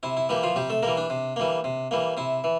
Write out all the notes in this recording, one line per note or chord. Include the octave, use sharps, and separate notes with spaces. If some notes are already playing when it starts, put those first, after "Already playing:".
C3 E4
E4
E3 G3 A#3 G4
F3 F4
C3 G3 G4
A3 A4
E3 G3 A#3 A#4
D4
C3
E3 G3 A#3
C3
E3 G3 A#3
C3 E4
E3